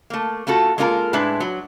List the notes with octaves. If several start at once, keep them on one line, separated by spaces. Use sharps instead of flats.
A3 A#3
A3 F4 F#4 A4
G#3 A#3 D4 F4 A4 A#4
A2 G#3 D4 E4 B4
F#3